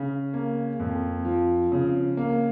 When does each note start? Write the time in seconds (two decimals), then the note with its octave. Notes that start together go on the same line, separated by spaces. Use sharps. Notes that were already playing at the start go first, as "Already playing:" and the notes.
Already playing: C#3
0.34 A#3
0.80 F2
1.25 F3
1.72 C#3
2.17 A#3